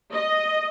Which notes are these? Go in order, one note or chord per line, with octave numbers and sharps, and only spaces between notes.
D#5